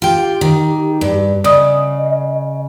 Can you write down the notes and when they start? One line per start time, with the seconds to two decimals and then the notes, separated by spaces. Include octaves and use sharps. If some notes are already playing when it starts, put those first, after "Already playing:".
0.02 F4 G4 G5
0.41 D#3
1.01 G2
1.44 C#3 D5 D#5 D#6